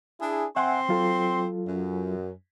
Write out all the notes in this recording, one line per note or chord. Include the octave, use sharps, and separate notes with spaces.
D4 E4 G#4
C4 E5 F#5 G#5 C6
F#3 F4 A4
F#2